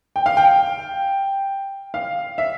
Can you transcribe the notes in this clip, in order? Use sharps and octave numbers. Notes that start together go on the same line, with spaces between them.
G5
F5
G5
F5
E5